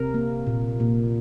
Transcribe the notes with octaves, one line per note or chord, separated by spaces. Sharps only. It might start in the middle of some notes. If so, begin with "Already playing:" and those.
Already playing: C3 A#4
A#3
A#2
A#2